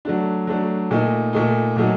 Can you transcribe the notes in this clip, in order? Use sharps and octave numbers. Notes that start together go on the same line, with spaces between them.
F#3 A3 D4
F#3 A3 D4
A#2 A3 D#4
A#2 A3 D#4
A#2 F#3 A3 D#4